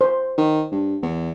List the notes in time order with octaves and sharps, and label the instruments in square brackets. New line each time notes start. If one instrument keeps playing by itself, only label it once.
[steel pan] C5
[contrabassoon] D#3
G2
E2